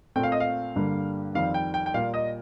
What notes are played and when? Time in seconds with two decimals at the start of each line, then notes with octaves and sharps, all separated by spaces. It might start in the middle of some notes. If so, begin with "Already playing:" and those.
0.16 A#2 A3 C4 G5
0.23 F5
0.32 D#5
0.40 F5
0.76 G2 D3 G3 A#3
1.35 F2 D#3 G3 C4 F5
1.54 G5
1.74 G5
1.86 G5
1.94 A#2 G3 A#3 F5
2.14 D#5